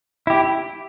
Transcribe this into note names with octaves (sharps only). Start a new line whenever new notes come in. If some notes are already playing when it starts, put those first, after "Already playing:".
E4 G4